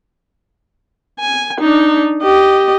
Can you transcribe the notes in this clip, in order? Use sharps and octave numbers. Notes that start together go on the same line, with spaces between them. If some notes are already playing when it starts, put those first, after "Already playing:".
G#5
D4 D#4
G4 D#5